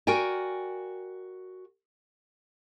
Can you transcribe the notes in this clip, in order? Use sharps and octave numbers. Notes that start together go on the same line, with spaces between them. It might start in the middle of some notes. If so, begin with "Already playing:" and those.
F#4 A#4 D5 G5 G#5